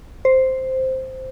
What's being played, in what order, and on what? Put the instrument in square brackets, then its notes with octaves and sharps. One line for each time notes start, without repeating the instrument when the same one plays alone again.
[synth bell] C5